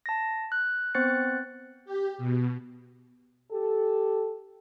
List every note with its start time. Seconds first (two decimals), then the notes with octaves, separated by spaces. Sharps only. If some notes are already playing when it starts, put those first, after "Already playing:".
0.06 A5 A#6
0.52 F#6
0.95 B3 C4 C5 F#6 A6 C#7
1.85 G4
2.18 B2
3.52 G4 A4